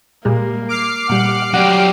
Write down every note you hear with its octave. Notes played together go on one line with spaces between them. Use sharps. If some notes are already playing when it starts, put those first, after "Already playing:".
A#2 G3 G#3 A#3
D6 F6 C7
A#2 G3 F#5
F#3 G4 D5 F#5